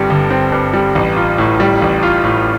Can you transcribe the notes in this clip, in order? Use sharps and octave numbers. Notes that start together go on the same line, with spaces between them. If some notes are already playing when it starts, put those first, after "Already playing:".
Already playing: G1 G2 G3 C4
G1
C4
G2
G3
A1
F4
A2
G3
A1
F4
A2